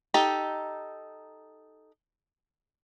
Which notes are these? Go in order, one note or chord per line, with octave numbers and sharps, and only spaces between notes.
D#4 G4 A4